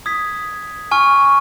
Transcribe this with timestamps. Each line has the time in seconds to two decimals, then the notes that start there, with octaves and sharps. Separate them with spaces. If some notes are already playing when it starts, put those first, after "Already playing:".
0.06 D#6 G#6 B6
0.91 G#5 C#6 F6